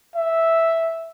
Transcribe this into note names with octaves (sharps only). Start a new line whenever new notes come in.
E5